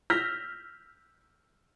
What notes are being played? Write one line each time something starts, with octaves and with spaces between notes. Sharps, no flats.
E6 F6 G6 A#6 B6